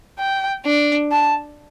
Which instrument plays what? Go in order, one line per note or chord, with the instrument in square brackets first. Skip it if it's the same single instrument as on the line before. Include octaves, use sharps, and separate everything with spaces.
[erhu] G5
[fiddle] D4
[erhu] A5